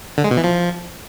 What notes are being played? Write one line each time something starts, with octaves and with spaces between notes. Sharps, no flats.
D3
G#3
B2
E3
F3